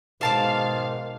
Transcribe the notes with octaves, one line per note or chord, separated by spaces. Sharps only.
G#2 B2 D#3 G#3 C5 F5 A5 D6